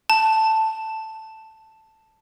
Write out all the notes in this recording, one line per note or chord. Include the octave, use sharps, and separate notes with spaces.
A5